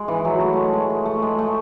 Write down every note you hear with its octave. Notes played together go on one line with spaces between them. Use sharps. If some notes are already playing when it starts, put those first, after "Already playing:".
Already playing: G#3
E3
F#3
A3
G#3 A3
G#3
A3
A3
G#3
A3